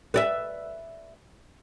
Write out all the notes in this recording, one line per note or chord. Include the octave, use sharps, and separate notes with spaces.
B4 D5 E5